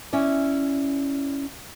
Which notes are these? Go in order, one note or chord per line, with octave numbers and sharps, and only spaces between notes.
C#4 E4 D5